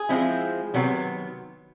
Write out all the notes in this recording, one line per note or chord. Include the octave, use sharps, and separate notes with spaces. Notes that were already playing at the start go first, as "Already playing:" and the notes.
Already playing: G#4
F3 G#3 C4 E4
C3 D#3 F#3 B3